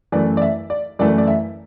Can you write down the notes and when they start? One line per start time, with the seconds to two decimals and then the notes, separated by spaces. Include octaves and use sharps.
0.12 F#2 E3 A3 D5
0.37 D5
0.42 E5
0.70 D5
0.99 F#2 E3 A3 D5
1.18 D5
1.27 E5